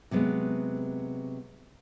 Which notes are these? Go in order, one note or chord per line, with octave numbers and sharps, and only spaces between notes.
C3 F#3 G#3 B3